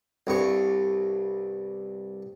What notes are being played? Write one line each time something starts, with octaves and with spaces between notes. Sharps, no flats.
C2 G2 C#6